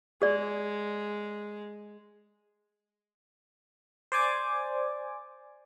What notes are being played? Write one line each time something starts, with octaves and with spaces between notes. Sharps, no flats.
G#3 G#4 D5
C5 D5 G#5 D6